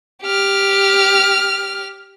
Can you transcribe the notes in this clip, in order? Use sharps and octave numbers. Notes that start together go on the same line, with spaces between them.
G4 F6